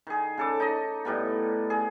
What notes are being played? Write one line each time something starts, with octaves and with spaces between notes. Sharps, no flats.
D#3 G#4
C#3 A4 D6
D#4 D#5
A2 G3 B3
G#4